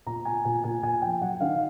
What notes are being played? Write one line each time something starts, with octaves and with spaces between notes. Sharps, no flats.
A#2 A#5
A#2 G#5
A#2 G#5
A#2 G#5
A#2 G#5
F3 G5
F#3 F#5
D#3 F5